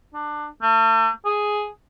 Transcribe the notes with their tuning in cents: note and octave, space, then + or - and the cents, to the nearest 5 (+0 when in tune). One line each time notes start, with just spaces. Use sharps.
D4 +20
A3 +40
G#4 +5